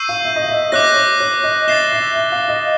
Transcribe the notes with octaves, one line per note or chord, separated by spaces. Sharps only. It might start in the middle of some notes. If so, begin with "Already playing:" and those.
Already playing: C#6 E6 G6 C7 D#7
F5
E5
D#5
E5
D#5
C#5 D6 F#6 A#6
C#5
C#5
D#5
E5 A6 C7 E7 G7
E5
E5
F5
D#5